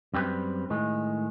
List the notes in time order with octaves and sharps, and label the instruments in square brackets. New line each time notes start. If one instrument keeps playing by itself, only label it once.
[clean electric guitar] F#2 G3 C4 G4 B4
A2 D#3 G#3